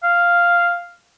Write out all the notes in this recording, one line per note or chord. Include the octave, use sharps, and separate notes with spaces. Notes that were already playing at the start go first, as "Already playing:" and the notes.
F5